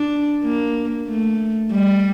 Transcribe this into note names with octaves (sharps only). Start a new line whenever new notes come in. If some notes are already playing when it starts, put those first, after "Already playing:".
Already playing: D4
A#3
A3
G3